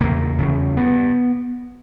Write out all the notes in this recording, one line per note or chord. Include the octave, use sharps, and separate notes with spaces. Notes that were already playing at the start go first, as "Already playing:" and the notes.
E2 C#3 A#3
E2 C#3
G2 B3